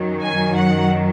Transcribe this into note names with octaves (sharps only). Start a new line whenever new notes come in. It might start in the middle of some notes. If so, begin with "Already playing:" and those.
Already playing: F#2 D#3 F#3
G#5
F#5